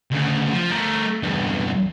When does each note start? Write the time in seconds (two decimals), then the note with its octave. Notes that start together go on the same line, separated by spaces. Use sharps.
0.11 D2 C#3
0.52 F3
0.71 A3 A#4
1.23 E2 G2